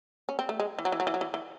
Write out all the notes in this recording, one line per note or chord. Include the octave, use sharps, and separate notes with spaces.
C#4
C4
A3
G#3
E3
F#3
E3
F#3
E3
F#3
E3
E3